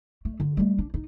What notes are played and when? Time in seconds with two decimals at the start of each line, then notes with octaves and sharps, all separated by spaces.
0.25 A3
0.40 D3
0.57 G3 A3
0.79 D4
0.94 D#4